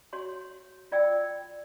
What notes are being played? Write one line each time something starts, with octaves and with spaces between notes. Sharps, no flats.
F#4 C#5 C6
F4 D5 G5 E6